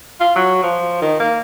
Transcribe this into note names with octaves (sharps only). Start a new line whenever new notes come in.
F4
F#3
F3
D#3
A#3